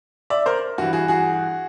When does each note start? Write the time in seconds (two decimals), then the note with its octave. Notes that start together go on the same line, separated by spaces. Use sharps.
0.30 D5 E5
0.46 A#4 C5
0.78 G2 E3 F#4
0.93 F#4 G#4
1.08 F#4 G#4